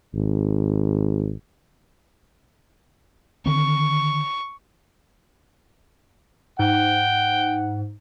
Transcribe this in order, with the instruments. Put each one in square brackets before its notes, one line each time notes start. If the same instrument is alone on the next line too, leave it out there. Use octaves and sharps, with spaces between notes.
[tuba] G#1
[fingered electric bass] D3 D#3 C4 [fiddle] C#6
[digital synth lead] G#2 [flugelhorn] F#5 [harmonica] G5